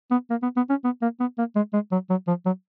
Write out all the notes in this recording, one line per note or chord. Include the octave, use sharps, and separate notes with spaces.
B3
A#3
B3
B3
C#4
B3
A#3
B3
A#3
G#3
G#3
F#3
F#3
F3
F#3